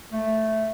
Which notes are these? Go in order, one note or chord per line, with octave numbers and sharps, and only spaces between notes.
A3